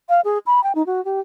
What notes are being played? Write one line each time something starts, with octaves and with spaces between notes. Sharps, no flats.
F5
G#4
B5
G5
D#4
F#4
G4